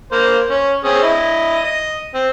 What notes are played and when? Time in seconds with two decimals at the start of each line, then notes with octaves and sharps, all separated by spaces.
0.12 A#3 C5
0.50 C#4
0.84 C4 C#4 G#4
1.03 E4 D#5
1.64 D#5
2.14 C4